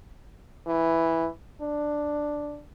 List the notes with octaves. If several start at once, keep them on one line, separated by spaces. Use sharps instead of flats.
E3
D4